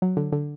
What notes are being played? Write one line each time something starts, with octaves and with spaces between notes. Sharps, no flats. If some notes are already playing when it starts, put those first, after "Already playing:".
F#3
D3
D3